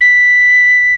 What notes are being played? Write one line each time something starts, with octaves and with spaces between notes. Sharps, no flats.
B6